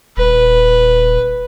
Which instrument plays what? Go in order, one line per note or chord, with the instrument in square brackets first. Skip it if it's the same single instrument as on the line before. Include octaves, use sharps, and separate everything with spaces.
[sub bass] D#1 [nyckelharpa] B4